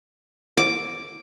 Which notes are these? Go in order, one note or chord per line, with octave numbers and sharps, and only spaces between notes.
D6